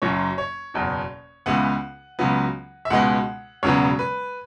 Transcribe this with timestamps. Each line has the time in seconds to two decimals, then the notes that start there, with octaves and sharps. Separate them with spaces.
0.02 F#1 F#2 F#3 C#5
0.38 C#5
0.74 F#1 E2 B2
1.46 C#2 C#3 E3 B3 F#5
2.19 C#2 C#3 F#3 B3
2.85 E5
2.90 C#2 B2 G#3 B3 F#5
3.63 E1 E2 C#3 F#3 B3 C#5
3.99 B4